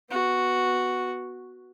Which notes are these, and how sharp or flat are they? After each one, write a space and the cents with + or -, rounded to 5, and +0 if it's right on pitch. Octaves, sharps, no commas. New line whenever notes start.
B3 +0 F#4 +0